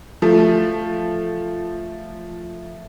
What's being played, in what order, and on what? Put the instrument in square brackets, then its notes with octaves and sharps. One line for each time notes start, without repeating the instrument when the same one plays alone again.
[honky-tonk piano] F3 A3